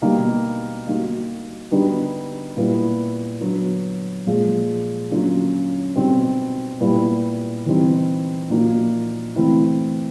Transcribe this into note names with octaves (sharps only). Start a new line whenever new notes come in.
B2 G3 A#3 D#4
G3 A#3 D#4 F#4
D3 G3 B3 D#4 F#4
A#2 G3 B3 E4
D3 F#3 B3
A#2 F3 G#3
D3 F#3 A#3 C#4 F4
B2 G3 C4 D#4 F#4
A#2 G3 B3 E4
E3 G3 C4 D#4
A#2 F3 A#3 D#4 F#4
E3 A3 C4 E4